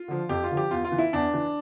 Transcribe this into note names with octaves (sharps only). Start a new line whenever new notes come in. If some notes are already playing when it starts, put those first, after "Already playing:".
Already playing: F4
D3 F3
F2 G4
F4
D3 F3
G4
E2 F4
F4
E3
E4
E2 D4
E3